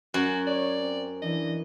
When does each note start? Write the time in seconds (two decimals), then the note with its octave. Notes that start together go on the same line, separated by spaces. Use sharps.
0.14 F#2 F#4
0.47 C#5 D5
0.79 C4
1.22 E3 D4 D#5